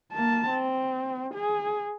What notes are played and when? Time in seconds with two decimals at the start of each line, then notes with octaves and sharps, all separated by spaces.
0.13 A#3 A5
0.49 C4
1.34 G#4